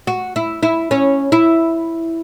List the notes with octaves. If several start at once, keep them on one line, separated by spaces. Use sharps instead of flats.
F#4
E4
E4
C#4
E4